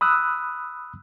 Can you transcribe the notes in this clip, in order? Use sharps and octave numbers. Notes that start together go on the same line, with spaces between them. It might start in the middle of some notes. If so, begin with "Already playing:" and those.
B5 D#6 E6 F#6